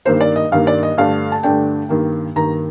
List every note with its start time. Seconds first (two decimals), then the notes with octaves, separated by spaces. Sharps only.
0.05 G2 D#3 A#3 D#4 C5
0.20 D5
0.36 D#5
0.52 G2 D#3 A#3 D#4 F5
0.67 D5
0.83 D#5
0.97 G2 D3 A3 D4 F5
1.32 A5
1.43 G2 D3 A3 D4 G5
1.89 G2 D#3 A#3
2.35 G2 D#3 A#3 A#5